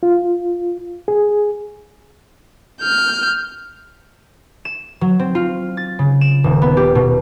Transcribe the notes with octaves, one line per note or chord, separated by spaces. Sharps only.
F4
G#4
F6 G6
E7
F#3
C4
F4
A6
C#3
E7
D#1
B3
G4
B2